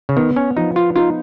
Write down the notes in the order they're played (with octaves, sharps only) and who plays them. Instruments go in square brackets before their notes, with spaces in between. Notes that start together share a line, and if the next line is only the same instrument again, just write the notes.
[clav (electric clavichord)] C#3
[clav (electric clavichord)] D#3 [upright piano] B3
[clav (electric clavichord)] C#4
[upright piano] F3 [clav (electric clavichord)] D#4
[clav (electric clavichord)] F4
[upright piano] D#4 [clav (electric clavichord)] F4